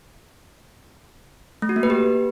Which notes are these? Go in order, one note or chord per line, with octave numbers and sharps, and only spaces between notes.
A3
F#4
A#3
B4
G4